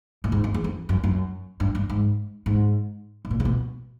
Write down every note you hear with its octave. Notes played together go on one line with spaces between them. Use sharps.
A2
G#2
F2
E2
F2
F#2
F#2
G2
G2
G#2
G#2
A2
A#2
C3
B2